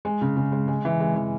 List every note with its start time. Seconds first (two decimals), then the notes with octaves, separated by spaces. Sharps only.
0.05 G#3
0.21 C#3
0.37 C#3
0.52 G#3
0.68 G#3
0.85 E3
1.00 G#3
1.16 E3